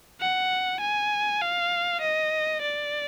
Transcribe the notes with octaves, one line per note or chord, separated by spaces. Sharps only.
F#5
G#5
F5
D#5
D5